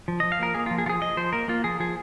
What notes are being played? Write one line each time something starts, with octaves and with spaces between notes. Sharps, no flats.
F3
F3 D#5
F5
A#3 A#4
A#3 G#4
F3 F4
G#4
F3 F4 G#4
F3 D#5
F3 C5
A#3 A#4
A#3 F4
F3 G#4
F3 G#4